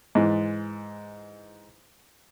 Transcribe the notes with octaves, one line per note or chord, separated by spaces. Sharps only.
G#2 E3